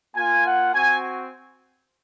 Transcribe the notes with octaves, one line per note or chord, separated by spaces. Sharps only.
A#3 F4 G#5
F#5
C4 F#4 G#5